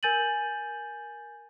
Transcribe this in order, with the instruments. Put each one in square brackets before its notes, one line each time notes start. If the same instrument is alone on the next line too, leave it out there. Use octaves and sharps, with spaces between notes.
[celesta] A#4 G#5 G6 A6 D#7 F#7